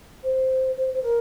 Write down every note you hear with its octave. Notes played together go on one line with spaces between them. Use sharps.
C5
C5
C5
A#4